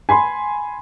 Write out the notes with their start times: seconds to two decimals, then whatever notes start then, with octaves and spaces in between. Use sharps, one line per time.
0.09 G#5 B5 C6